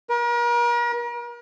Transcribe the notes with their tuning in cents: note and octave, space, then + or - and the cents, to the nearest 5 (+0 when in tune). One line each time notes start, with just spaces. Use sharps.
A#4 +40